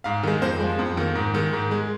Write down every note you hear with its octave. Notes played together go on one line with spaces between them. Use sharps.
G#2 F5
D#3 G#3
F2 C5
F3 G#3
F2
D#3 A#3
G#2
D#3 G#3
G#2
G#3